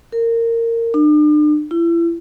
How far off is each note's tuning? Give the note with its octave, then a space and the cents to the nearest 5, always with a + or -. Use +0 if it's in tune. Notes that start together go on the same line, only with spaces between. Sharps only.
A#4 -20
D4 +40
E4 +35